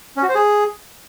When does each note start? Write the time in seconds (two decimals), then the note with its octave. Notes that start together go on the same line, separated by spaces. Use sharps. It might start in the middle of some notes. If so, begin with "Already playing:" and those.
0.17 C#4
0.23 F#4
0.29 C5
0.35 G#4